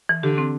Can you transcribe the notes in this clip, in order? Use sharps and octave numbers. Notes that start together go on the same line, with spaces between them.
E3
D3 G4
C4